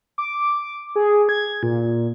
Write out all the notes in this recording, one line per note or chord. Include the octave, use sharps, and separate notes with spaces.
D6
G#4
G#6
A#2